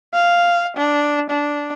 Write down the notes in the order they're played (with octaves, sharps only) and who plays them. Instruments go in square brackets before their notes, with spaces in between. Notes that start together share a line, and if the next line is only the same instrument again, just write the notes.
[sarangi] F5
D4
D4